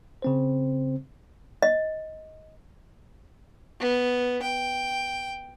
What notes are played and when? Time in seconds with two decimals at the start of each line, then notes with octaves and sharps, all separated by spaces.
0.22 C#3 C4 C5
1.62 D#5
3.80 B3
4.42 G5